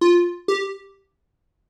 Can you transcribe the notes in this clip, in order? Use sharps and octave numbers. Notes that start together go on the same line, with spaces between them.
F4
G4